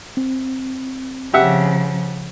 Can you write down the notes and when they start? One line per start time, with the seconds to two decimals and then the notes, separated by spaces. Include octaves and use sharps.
0.17 C4
1.34 C#3 F3 G4 E5 F#5